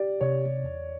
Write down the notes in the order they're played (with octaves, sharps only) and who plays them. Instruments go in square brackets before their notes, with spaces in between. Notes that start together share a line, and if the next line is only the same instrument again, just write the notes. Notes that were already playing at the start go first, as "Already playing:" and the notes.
Already playing: [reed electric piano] G4 [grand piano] D5
[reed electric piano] C3 [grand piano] C#5
[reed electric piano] E2